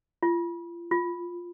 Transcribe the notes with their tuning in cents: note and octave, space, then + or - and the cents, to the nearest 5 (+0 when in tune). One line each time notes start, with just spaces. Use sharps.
F4 -35
F4 +5